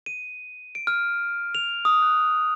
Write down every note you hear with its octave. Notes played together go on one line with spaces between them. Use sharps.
D#7
D7
F6
F7
D#6
F#6